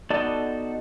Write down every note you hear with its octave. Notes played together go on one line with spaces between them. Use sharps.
B3 D#4 F#4 A4 D5 D#5